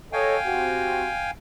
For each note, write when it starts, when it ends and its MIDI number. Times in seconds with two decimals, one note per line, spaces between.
0.13 0.36 69
0.13 0.36 73
0.13 0.36 75
0.13 1.31 77
0.13 1.31 79
0.13 1.31 80
0.46 1.09 60
0.46 1.09 66
0.46 1.09 67